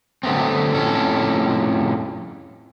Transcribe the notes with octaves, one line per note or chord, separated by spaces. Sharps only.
D3 F#3 A3 B3 C4
F2 A2 C#4 A4